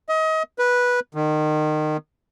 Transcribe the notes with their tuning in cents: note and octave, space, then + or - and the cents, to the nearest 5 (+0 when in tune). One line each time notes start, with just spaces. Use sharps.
D#5 +30
B4 -10
D#3 -25